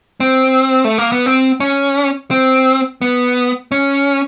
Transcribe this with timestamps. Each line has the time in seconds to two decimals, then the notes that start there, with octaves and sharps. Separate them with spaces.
0.20 C4
0.85 A3
0.98 A#3
1.12 B3
1.26 C4
1.60 C#4
2.31 C4
3.02 B3
3.72 C#4